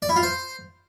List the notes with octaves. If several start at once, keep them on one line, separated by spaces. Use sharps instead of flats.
D5
E4
F4
C5